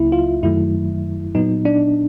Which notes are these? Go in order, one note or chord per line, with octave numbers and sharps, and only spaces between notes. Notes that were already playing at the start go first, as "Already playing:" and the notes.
Already playing: C#2 C#3 F#3 A#3 E4
F4
F#2 D#3 F#3 A3 E4
A#2 F#3 B3 D#4
D4